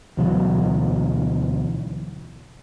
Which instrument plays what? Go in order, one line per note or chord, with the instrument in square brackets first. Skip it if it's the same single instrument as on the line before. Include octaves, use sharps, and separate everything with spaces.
[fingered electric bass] D2 B2 E3 F#3